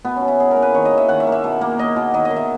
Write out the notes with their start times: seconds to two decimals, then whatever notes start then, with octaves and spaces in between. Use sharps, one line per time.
0.05 B2 B3
0.16 C#4
0.21 B2
0.28 E4
0.39 B2 G#4
0.51 A#4
0.57 A#3
0.62 B4
0.74 D#3 C#5
0.85 D#5
0.91 A#3
0.98 E5
1.08 D#3 F#5
1.20 E5
1.27 A#3
1.32 E5
1.44 B2
1.61 A#3
1.79 A#3 D#5
1.96 B2
2.14 D#3 D#5
2.25 D#5
2.31 D#3
2.36 E5